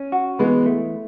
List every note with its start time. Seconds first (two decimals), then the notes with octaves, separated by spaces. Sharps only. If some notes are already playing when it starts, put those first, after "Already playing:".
Already playing: C#4
0.12 F#4
0.39 E3 G#3 B3
0.66 A3